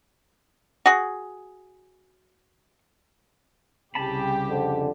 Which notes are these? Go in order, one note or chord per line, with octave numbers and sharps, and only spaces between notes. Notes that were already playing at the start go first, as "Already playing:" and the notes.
F#4 G#4
C2 C#3 G4 A5 B5
F2 D3